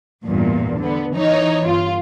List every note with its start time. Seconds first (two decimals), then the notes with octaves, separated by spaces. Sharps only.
0.24 A1 E2 G2 A#2
0.80 D3 B3
1.15 E3 D#4 C#5
1.63 G1 F4